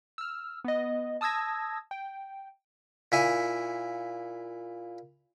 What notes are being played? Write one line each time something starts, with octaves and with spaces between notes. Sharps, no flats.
E6 F6
B3 D#5
A5 D#6 E6 G#6 A#6
G5
A#2 E4 G#5